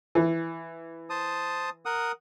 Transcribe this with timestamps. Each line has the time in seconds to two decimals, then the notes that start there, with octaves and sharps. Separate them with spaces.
0.15 E3
1.10 C5 A5 D#6
1.85 A#4 F#5 D#6